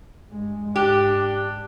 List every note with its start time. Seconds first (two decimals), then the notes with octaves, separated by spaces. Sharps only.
0.31 G2 G#3
0.76 G#2 D4 G4